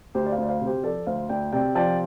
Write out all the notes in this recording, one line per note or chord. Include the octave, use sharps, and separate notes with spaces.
D2 G4 C5
D5
C5 F5
D2 D5
C5 F5
C3
G4 C5
F3 A4 D5
D2 C5 F5
D2 D5 G5
C3 D5 G5
F3 D5 G5